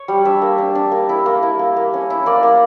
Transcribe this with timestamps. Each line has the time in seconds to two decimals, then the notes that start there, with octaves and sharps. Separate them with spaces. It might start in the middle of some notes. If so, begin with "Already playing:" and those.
Already playing: C#5
0.08 G3
0.25 D4 E5
0.42 A#3
0.58 D4
0.75 D4
0.92 A#3
1.09 E4
1.26 A#3
1.43 E4
1.59 A#3
1.76 A#3
1.93 C#4
2.10 E4
2.26 A#3 D5
2.43 A#3